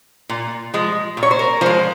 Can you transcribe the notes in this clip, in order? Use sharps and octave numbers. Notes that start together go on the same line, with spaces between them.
A#2
F3 G#3
A#2
C#5
C5
A#4
F3 G#3 C5